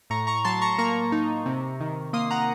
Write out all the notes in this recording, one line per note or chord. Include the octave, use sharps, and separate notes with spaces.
A2 A#5 C#6
A#5 C#6
F#3 A5 C6
A#5 C#6
A#3 A#5 C#6
D#4
C3
D#3
A#3 C6 D#6
F#5 A#5